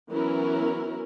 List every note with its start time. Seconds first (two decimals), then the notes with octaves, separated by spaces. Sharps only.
0.10 E3 F#3 B3 C#4 E4 A#4